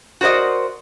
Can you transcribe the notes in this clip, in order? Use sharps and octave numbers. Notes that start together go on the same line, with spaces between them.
F#4 A#4 C5 D5 D#5